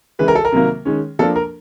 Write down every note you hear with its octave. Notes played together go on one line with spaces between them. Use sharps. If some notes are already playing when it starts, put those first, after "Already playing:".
C#3 E3 G#3 B4
A#4
A4
A#4
C3 D#3 F#3 A#3
D#3 G#3 C#4
F3 A#3 D4 A4
A#4